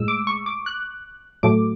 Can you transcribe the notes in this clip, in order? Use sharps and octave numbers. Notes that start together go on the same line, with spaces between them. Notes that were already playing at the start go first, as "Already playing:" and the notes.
Already playing: A2 G#3 E6
D6
C#6
D6
F#6
A2 F#3 A3 D6